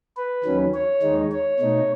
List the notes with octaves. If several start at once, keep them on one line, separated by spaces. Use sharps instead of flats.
B4
D#2 D#3 F#3 C#4
C#5
D#2 D#3 G#3 D#4
C#5
B2 A3 D#4